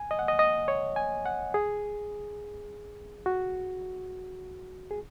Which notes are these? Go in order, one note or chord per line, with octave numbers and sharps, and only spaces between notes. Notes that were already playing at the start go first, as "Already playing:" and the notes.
Already playing: G#5
D#5
F#5
D#5
D#5
C#5
G#5
F#5
G#4
F#4
G#4